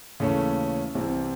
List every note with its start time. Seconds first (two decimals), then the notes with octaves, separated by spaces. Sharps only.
0.20 D#2 C#3 E3 A3 C#4
0.95 C2 C3 E3 C4 E4